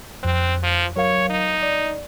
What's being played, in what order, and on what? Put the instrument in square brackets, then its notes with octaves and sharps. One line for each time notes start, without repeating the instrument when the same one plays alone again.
[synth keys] F2 F#6 [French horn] C4
[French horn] F3
[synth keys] F#3 A#4 F5 [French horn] C#5
[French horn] D#4
[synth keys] D5